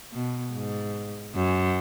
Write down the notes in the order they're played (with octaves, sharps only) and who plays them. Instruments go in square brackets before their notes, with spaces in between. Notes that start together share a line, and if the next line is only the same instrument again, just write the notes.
[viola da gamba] B2
G#2
F#2